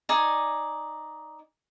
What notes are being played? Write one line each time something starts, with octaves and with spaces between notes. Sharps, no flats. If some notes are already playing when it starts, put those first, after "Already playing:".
D#4 D5 G#5